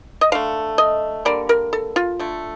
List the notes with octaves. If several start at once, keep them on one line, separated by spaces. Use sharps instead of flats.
D#5
D3 A3 F5
D#5
D3 G3 A#3 D5
A#4
A4
F4
D3 A3